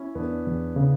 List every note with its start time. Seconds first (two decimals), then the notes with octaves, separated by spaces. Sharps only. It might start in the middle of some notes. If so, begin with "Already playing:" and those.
Already playing: C#4 E4
0.15 E2 B3 D4
0.47 E2
0.76 C#3